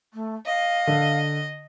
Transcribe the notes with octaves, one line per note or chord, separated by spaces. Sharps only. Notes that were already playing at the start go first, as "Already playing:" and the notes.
A3
D#5 F5
D3